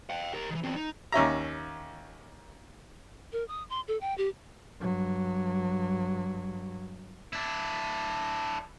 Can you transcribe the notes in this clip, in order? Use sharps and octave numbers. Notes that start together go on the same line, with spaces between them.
F5 G5
G4 A#4
D#3 E3
E2 C4
D#4
D#2 C#4 E5 A#5
A#4
D#6
C6
A4
G5
G4
G2 F#3
D4 E4